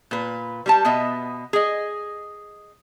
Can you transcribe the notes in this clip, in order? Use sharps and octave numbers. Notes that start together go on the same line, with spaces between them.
A#2 B4
G3 G4 A5
B2 B3 D#5 E5
G#4 D#5